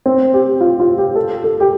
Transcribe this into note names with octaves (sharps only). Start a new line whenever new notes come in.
C4
G4
F4
F4
G4
A4
A4
G4